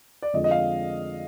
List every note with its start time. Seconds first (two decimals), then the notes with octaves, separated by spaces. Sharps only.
0.22 D5
0.33 F2 D3 F3 G#3 D#5
0.44 D#5
0.51 F5